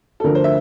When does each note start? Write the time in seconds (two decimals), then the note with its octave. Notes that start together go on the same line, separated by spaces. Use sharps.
0.20 A4
0.24 D2 D3 F3 A#4
0.35 C5
0.44 E5